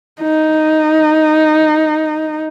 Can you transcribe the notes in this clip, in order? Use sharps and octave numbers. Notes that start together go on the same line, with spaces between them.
D#4